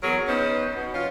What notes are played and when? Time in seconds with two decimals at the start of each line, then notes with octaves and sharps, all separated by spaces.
0.02 E2 F#3 G#4 A#4
0.28 B3 C#4 D#4 C5
0.75 B2
0.94 F3 C#4 F4